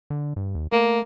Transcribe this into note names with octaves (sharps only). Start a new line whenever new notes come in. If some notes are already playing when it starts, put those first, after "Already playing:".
D3
G2
D#2
A3 A#3